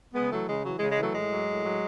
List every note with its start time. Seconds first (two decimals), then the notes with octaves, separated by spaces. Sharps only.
0.14 C#3 G#3 B3
0.31 E3 F#3 A3
0.48 C#3 G#3
0.64 E3 F#3
0.77 G#3
0.81 C#3
0.90 G#3
0.97 E3 F#3 A3
1.14 A2 G#3
1.31 F#3
1.48 A2
1.64 F#3